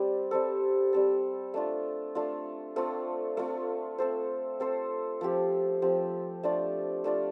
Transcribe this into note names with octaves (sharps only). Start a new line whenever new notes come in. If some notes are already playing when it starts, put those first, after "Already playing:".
Already playing: G3 C4 G4 D5
G3 C4 A4
G3 C4 A4
A3 D4 F4
A3 D4 F4
A3 C4 F4
A3 C4 F4
C4 A4 C5
C4 A4 C5
F3 C4 G4
F3 C4 G4
A3 D4 F4 D5
A3 D4 F4 D5